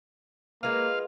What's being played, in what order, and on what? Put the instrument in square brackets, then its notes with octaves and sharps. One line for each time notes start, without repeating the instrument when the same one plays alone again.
[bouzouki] G#3 F4 [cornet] A#3 [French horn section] B4 [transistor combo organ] F5